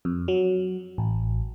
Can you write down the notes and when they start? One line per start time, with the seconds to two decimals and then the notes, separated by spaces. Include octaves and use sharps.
0.05 F2
0.28 F#3
0.98 A1